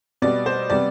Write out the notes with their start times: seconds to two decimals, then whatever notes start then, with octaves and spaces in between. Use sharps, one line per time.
0.22 B2 G3 B3 D5
0.46 C5
0.70 C3 G3 B3 D5